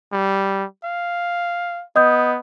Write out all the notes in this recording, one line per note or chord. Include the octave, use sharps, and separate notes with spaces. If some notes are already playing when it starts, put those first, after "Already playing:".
G3
F5
B3 D#5 D#6 G6